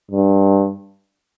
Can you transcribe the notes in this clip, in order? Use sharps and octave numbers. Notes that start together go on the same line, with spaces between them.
G2